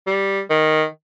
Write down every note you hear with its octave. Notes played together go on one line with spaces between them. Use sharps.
G3
D#3